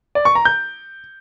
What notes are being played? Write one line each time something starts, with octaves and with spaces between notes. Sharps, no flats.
D5
C#6
A#5
G6